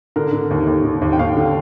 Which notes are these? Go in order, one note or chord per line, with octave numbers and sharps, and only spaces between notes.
D3 A#4
D3
D#2
D#2
D3
D#2
G5
D#2 F5
D3